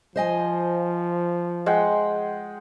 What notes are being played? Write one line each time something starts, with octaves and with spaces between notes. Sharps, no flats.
F3 C5 D#5 G#5
G#3 F#5 G5